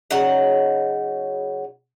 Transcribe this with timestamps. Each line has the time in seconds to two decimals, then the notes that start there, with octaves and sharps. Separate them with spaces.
0.10 C#3 F#3 D#4 F#5